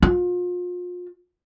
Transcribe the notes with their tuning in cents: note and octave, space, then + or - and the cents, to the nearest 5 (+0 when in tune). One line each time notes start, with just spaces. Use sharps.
F4 +35